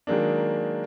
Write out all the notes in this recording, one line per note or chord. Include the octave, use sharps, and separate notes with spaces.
D#3 F#3 G#3 A#3 D4